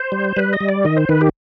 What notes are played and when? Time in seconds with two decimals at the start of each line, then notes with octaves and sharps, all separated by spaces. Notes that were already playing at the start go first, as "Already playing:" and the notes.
Already playing: C5
0.12 G3
0.37 G3 B4
0.53 D#5
0.61 G3
0.69 D5
0.85 D#3 D#5
0.97 C5
1.09 D#3 B4
1.21 G4